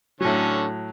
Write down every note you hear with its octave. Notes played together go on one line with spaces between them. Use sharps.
A2 D3 F#3 C#4 C#5